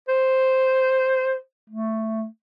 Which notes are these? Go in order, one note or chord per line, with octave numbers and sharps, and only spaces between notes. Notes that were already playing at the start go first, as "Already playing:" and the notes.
C5
A3